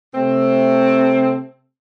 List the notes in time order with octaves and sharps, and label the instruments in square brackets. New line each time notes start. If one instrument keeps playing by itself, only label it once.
[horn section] C3 A3 C4